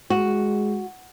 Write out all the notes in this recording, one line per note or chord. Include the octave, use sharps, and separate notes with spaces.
G#3 F#4